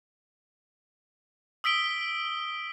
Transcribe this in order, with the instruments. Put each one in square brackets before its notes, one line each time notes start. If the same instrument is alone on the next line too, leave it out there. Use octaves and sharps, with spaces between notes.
[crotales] D#6 E6 B6 D7 G7